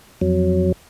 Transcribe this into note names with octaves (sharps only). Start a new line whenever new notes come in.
F2 F#3